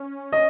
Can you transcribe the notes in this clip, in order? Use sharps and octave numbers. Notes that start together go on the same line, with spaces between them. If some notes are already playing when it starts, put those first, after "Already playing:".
Already playing: C#4
D#5